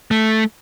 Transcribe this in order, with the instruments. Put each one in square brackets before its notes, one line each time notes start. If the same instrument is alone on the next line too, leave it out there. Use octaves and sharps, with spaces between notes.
[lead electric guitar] A3